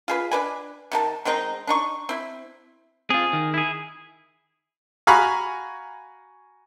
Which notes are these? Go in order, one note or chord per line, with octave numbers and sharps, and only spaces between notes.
F4 G#4 B4
D4 B4 G#5
C3 D#3 A5
D#3 G#3 C4 D#4
D4 D#4 C#6
C4 E4
C4 F4 G#4
D#3
E4 G#4
F#4 F5 G#5 A#5 B5 C#6